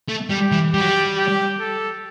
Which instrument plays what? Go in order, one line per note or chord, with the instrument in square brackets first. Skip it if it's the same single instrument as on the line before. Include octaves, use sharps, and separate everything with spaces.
[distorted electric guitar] A3
[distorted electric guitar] G3 [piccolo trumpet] G4
[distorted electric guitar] E3
[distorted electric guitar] G3 [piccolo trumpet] G4
[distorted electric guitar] F#3
G3
[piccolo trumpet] G4
A4